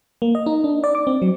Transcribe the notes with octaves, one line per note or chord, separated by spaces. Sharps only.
A#3
D#5
D#4
D4
D5
D6
C4
F#3